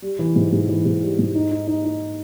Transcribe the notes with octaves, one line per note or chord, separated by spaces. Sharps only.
G3
E3
G#2
G#2
E3
G#2
G3
G#2
D#4
D#4
D#4
D#4